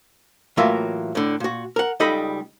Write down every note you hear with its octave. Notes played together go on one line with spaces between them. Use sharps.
A2 E3 F#3 A#3 F4 E5
A2 D3
A#2 F#4
A#4 F#5
C#2 G3 D#4 A4 D#5 B5